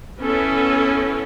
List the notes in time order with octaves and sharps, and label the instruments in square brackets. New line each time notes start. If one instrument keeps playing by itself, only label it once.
[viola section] B3 C#4 E4 A4